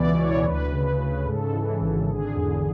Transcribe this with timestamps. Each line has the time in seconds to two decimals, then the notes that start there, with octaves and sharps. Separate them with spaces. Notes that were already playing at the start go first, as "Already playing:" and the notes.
Already playing: C#2 B2 E3 D5
0.17 C#2 C#5
0.44 D2 B4
0.72 C#3
0.99 C#3
1.26 G#2 A4
1.54 E3
1.81 G#1
2.09 D3 G#4
2.36 E2